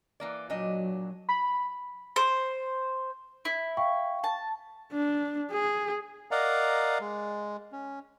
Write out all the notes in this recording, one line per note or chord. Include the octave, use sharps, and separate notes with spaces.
E3 A#3 D5
A#2 F#3 D4 D#5
B5
C5
E4
F5 G5 C#6
A5
D4
G#4
A#4 D5 D#5 F5 F#5 A#5
G#3
C#4